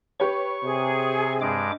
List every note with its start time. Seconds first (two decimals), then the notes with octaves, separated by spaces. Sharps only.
0.20 G4 B4 C#5 C#6
0.64 C3 G#4
1.41 G2 G#3 D6